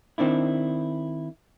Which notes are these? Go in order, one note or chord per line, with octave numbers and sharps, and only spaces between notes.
D#3 C4 D4 E4